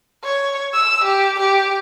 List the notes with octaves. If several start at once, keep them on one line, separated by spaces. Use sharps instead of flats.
C#5
E6
G4
G4